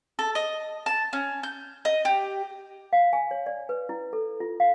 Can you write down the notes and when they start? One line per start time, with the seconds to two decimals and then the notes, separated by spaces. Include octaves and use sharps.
0.19 A4
0.35 D#5
0.86 A5
1.13 C#4
1.43 G6
1.85 D#5
2.05 G4
2.93 F5
3.13 G#5
3.31 C#5
3.46 D5
3.69 B4
3.89 E4
4.13 A4
4.40 F4
4.60 F5